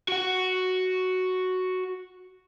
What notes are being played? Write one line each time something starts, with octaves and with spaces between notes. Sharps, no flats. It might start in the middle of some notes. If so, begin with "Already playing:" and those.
F#4 F#5